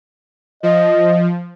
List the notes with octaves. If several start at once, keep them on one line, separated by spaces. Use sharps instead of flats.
F3 D#5